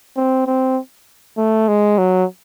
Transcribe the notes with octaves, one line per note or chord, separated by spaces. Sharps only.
C4
C4
A3
G#3
F#3